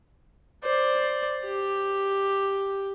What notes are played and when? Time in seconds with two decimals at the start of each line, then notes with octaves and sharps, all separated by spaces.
0.64 C5 D5
1.44 G4